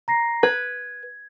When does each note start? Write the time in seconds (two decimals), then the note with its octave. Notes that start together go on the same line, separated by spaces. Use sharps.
0.08 A#5 A#6 C7
0.43 B4 G#6